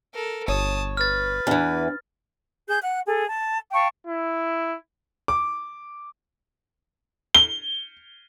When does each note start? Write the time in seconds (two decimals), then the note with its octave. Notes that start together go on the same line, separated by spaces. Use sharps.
0.14 A4 A#4
0.48 G1 C#5 A5 D#6
0.97 B4 F6 A6
1.47 E2 E3 D4
2.67 G#4 G6
2.82 F#5 F#6
3.07 G#4 A4
3.27 A5
3.73 F5 G5 A5 C#6
4.07 E4
5.28 D6
7.35 G7